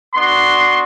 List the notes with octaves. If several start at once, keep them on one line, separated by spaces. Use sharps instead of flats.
B3 D4 F#4 C6